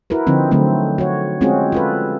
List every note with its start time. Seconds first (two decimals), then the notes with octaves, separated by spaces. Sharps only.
0.10 E4 F#4 A#4 B4
0.27 D3 F3 C4 D#4
0.51 D3 F#3 A3 C4
0.98 F#4 C#5
1.41 G#3 C4 C#4 F4 F#4 G#4
1.72 F4 A4 B4